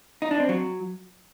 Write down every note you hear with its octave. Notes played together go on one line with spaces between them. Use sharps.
D#4
D4
C4
F#3